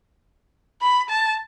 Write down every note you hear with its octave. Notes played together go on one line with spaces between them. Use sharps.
B5
A5